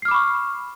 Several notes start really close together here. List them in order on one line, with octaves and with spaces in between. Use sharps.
C7 F6 D6 B5 C#6